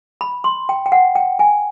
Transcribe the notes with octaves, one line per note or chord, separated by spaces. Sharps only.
B5
C6
G5
G5
F#5
G5
G#5